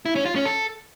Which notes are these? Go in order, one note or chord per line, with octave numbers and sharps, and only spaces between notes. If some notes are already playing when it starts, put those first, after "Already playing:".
E4
C#4
F4
C#4
A4